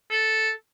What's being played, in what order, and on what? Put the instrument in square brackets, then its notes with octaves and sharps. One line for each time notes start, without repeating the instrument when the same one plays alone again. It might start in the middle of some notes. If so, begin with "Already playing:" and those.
[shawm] A4